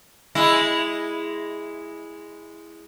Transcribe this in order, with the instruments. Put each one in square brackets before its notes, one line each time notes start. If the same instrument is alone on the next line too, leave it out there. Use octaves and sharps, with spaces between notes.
[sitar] G#3 E4